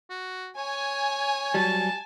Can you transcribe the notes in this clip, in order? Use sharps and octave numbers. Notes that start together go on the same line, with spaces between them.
F#4
C#5 G#5
F#3 G3 A5